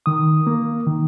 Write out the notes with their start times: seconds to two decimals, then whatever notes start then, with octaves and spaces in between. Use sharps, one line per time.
0.06 D#3 D#6
0.47 A#3
0.87 D#3